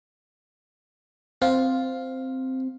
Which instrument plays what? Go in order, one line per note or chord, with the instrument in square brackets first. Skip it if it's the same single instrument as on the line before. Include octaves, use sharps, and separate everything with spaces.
[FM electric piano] C4 [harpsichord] F4